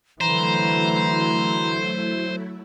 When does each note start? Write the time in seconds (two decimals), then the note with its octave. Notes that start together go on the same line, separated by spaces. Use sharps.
0.21 D3 E3 F#3 A3 E4 C5 A#5